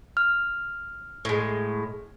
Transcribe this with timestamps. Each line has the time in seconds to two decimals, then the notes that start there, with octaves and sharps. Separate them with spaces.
0.17 F6
1.25 A2 G#3